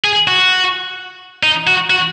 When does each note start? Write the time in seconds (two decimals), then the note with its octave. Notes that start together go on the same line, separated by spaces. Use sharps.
0.04 G#4
0.28 F#4
1.43 D#4
1.67 F#4
1.90 F#4